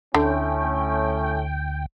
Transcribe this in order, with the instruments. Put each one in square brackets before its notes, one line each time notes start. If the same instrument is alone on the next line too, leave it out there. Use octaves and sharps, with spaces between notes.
[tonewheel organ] D2 G5 [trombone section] A2 A3 C#4 [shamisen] D3